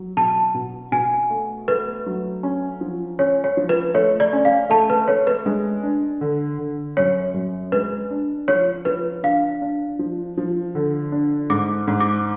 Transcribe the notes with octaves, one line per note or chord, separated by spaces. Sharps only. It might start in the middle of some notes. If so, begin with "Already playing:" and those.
Already playing: F#3
B2 A5
B2
B2 G#5
A3
A3 B4
F#3
C#4
F3
C#4 C#5
C#5
F3
B4
A3 C#5
D5
C#4
F5
A3 A5
B4
A3 C#5
B4
G#3
D4
D3
D3
F#2 C#5
F#2
G#3 B4
D4
F3 C#5
F3 B4
D4 F5
D4
F3
F3
D3
D4
G#2 D6
G#2
D6